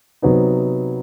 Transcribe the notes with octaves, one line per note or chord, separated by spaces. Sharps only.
C3 F#3 B3 D#4